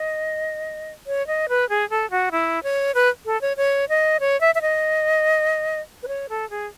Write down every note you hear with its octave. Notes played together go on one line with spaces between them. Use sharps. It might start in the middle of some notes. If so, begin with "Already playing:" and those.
Already playing: D#5
C#5
D#5
B4
G#4
A4
F#4
E4
C#5
B4
A4
C#5
C#5
D#5
C#5
E5
E5
D#5
B4
C#5
A4
G#4